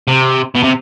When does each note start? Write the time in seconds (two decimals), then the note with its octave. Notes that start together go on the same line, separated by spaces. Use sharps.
0.07 C3
0.56 B2
0.64 C3